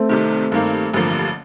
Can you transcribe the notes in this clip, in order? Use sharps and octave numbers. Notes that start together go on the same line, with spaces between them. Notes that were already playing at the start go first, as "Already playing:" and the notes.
Already playing: A3 C4
C2 C3 D#3
G2 D#3 A#3
A1 G2 D3 F3 A#3